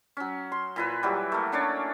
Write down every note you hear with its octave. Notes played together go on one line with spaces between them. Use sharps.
F#3 C#4
C6
A#2 E4 B4
E3 F#3 G3
A3 A#3
C#4 D4 C#5 D5